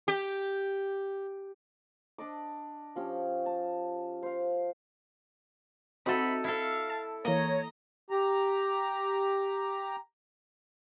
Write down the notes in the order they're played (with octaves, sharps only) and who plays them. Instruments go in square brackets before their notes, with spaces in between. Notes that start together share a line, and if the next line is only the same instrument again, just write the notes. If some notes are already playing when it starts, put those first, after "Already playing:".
[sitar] G4
[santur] D4 D5 D#5 D6
F3 C#4 G4
A5
C5 F5
[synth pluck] C4 F#4 E5 [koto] D#4 A4 [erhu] B5
[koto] E4 A4 [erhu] F5
[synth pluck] A5
[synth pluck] E3 A#3 [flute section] C#5 [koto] D#5 [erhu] A#5
[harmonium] G4 A#5